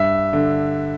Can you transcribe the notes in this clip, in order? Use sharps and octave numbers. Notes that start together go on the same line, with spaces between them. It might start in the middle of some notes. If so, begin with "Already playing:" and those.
Already playing: G2 E5
D3